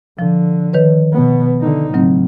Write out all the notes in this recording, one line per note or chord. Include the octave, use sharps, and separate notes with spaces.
D3 F3
D#3 B4 C#5
B2 B3
D3 D#4
A2 C#3 F#3 C4